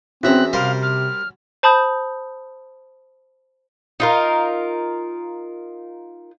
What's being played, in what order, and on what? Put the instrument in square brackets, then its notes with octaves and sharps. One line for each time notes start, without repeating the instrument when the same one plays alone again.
[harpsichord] E2 E5 A#5 [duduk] C4 [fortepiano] C#4 F#4 [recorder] F#6
[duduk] C3 [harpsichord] G3 A#4 C5 [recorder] F5
[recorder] F6
[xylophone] C5 A5 B5 D#6 G6
[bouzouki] D#4 F4 A#4